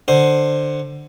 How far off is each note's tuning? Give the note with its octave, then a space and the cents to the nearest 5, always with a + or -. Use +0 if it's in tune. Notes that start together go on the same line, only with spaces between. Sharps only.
D3 +15 C5 +10